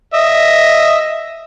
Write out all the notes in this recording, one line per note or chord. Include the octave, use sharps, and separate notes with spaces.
D#5 E5